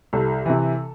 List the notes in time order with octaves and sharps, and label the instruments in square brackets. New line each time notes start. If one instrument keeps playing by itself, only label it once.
[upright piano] C2 A4
C3 E3